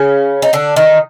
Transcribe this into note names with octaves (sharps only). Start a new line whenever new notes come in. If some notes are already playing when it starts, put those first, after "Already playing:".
Already playing: C#3 C#4
D#4
D3 D4
D#3 D#4